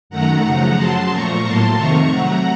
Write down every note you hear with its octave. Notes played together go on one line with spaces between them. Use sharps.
F#2 D#3 A3 F#5 A#5
F#2 C#3 F3 A3
F#2 C#3 F#3 A5 C6
A#2 F3 A3 A#5 C#6
A2 F#3 A#3 A5 C6
F2 C3 D#3 A3 A#5 C#6
C3 F#3 A3 F#5 A#5